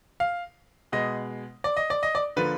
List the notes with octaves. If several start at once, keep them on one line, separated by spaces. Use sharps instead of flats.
F5
B2 G#3 D#5
D5
D#5
D5
D#5
D5
D3 F3 A#3 B4